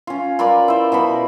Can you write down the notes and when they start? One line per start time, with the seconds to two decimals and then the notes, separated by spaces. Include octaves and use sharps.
0.07 C#4 F4
0.39 F4 A#4 B4 D5
0.68 E4 C5
0.92 B2 F#4 B5